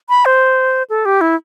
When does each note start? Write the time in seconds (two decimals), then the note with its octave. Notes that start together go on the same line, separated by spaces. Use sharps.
0.09 B5
0.25 C5
0.90 A4
1.05 G4
1.21 E4